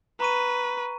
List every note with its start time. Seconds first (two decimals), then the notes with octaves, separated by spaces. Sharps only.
0.20 B4 A#5 C#6 D#7